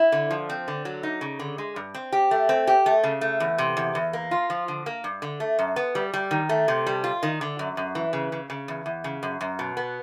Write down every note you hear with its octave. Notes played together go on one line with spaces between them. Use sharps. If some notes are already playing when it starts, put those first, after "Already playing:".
Already playing: E4
D3
F3
C4
D3
F#3
D#4
C#3
D3
G#3
G2
C4
G4
A3
C4
G4
A3
C#3
A3
E2
C3
E2
E2
A#3
F4
F3
D3
A#3
G2
D3
A3
F#2
B3
G3
G3
D#3
A3
C3
G3
F4
D#3
D3
F#2
F#2
E3
C#3
C#3
C#3
E2
E2
C#3
F#2
F#2
B2
B3